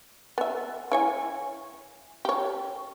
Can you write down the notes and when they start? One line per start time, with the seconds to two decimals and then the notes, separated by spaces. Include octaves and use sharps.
0.38 B3 E5
0.92 E4 C#5 G#5
2.25 G4 C#5